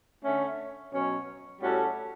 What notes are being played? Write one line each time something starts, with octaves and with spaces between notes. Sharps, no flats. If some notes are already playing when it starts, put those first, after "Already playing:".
D3 A3 C#4
B2 F#3 C#4
A2 G3 C#4 F#4 A4